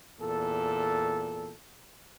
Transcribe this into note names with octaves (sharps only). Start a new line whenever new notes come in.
E2 A#2 A4